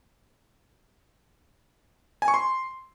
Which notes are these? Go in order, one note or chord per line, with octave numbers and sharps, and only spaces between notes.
G#5
C#6
C6